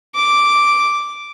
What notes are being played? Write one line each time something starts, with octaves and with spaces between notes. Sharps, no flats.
D6